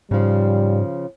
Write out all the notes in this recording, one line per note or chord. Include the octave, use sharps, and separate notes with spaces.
G#2 C#3 F3 G3